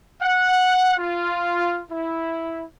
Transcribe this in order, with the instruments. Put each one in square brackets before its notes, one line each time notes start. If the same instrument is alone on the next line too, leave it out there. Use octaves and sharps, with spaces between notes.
[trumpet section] F#5
F4
E4